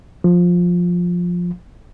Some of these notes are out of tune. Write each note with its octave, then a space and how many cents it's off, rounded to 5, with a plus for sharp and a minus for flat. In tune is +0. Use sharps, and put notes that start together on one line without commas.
F3 +10